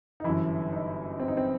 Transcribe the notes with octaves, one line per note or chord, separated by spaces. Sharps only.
D#4
G1 F#2 E3 E4
D#4
C4
D#4
C4